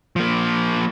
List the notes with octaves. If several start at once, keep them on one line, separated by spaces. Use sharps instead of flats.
F3 A#3